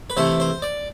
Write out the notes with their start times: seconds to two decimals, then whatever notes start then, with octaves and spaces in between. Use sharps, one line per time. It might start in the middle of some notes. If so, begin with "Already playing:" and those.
0.10 B4
0.17 C3 E3 A3 C5
0.40 C5
0.62 D5